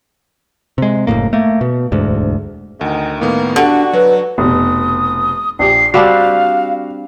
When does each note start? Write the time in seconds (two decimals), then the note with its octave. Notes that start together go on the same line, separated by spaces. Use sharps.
0.78 C3 G#3
1.07 F#1 E2 A2 A#3
1.33 A3 A#3
1.61 B2
1.92 E1 D2 G#2
2.81 D2 D#3
3.21 A2 D#3 A#3 B3
3.56 D3 D4 F#4 G4
3.93 F#3 B4
4.38 F1 B2 D#6
5.59 A#1 G4 C7
5.94 G3 C4 D4 F#4 F5